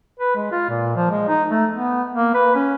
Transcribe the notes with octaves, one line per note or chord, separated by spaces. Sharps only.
B4
G#3
F4
A#2
F3
G#3
D#4
A3
B3
A#3
B4
C#4